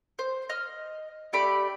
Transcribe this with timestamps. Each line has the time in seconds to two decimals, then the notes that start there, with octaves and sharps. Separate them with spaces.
0.19 C5
0.49 D#5 F6
1.33 A3 G4 D5 B5